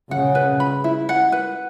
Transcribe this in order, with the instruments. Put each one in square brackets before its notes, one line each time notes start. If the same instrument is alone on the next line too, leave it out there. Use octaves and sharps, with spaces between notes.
[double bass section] C#3 [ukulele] F#5
[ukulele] B4
B5
E4
F#5
B4